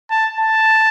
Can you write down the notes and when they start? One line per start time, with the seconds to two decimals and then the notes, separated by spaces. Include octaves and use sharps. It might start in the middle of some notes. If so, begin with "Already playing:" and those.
0.11 A5
0.39 A5